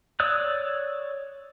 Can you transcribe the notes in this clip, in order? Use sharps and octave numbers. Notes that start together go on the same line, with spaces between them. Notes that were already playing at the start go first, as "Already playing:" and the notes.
C#5 D5 D#6 E6 F#6